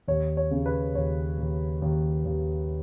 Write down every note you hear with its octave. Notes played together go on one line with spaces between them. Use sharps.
D#2 C#5
C#5
C#3
B4
D#2 C#5
D#2
D#2
D#2